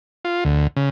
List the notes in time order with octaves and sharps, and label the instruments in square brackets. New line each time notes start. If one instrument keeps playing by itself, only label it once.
[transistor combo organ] F4
D2
C#3